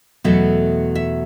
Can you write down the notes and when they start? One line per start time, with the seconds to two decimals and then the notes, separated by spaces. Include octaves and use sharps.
0.24 E2 B2 F#3 A3 E5
0.95 E5